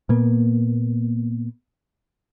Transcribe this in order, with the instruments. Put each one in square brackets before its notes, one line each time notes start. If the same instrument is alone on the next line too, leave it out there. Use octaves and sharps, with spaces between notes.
[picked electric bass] A#2 A#3 B3